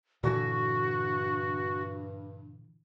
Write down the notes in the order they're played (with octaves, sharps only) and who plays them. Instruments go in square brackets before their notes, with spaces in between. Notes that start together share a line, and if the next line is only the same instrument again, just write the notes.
[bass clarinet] G2 [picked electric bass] A#2 D3 E3 [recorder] F#4